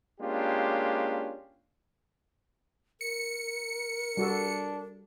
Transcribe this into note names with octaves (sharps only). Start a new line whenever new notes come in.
G#3 A#3 C#4 D4 F4 G4
A#4 C#7
G3 D4 F#4 A4